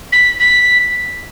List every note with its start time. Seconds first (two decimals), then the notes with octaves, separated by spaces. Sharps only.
0.12 B6
0.39 B6